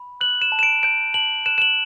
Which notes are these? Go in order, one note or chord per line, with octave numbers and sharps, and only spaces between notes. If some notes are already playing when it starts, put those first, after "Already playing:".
Already playing: B5
F#6 F#7
E7
A5
E7
D7
G6 D7
A5 F#7
F#6 E7
E7
F#7